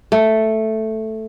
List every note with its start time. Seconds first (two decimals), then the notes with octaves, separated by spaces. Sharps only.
0.12 A3